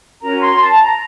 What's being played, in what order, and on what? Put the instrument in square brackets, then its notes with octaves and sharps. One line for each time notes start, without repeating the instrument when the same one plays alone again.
[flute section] C#4 F#4 A#4 A#5
C6
A5
A#5